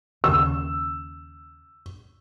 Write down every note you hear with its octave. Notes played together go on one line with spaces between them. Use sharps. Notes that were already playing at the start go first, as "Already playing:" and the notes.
D#2 C#3 E6